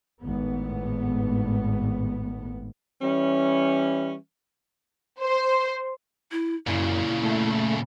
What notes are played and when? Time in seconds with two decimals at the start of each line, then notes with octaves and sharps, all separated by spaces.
0.22 G#1 A2 B3
3.01 E3 G3 C#4
5.20 C5
6.32 E4
6.67 F#2 A#2 C#3 E4
7.23 A3